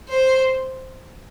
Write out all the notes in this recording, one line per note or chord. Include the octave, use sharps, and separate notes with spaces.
C5